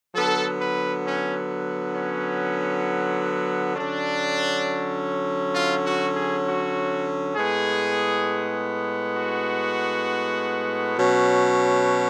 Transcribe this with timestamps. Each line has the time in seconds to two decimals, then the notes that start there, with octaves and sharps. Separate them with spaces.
0.15 D3 F#3 B3 A4
0.60 B4
1.05 C#4
1.96 C#4
3.75 D3 F#3 C#4 D4
5.55 F4
5.86 F#4
6.16 G#4
6.46 F#4
7.36 A2 G#3 B3 G#4
9.15 F#4
10.96 B2 F#3 C#4